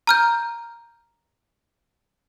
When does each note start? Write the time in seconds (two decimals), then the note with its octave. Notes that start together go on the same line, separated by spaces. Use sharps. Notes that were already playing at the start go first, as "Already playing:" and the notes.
0.07 A#5 F6 G6